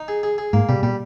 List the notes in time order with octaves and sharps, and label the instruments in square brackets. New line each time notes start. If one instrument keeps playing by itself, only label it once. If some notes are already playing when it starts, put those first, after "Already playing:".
Already playing: [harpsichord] D#4
G#4
G#4
G#4
[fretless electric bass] G#2 [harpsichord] A#3
[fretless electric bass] B2 [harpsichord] G3
[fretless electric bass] A#2 [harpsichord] G3